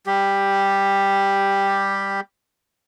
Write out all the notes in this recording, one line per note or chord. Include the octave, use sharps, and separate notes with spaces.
G3 G4